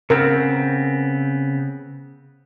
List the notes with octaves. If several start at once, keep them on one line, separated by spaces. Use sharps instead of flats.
C#3 B3 C4 A#4